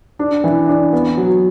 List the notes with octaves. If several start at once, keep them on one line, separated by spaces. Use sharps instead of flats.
D4
E3
D4
B3
F#3